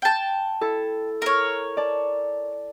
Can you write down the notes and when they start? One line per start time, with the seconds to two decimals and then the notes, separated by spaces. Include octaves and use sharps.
0.02 G5 A5
0.61 E4 A4
1.22 A#4 C#5
1.77 D5 A5